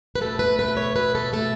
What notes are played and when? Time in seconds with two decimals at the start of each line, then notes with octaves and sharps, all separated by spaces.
0.15 B4
0.21 B2 A3 A4
0.39 B4
0.59 B2 A3 B4
0.77 C#5
0.95 B2 A3 B4
1.15 A4
1.33 B2 A3 A4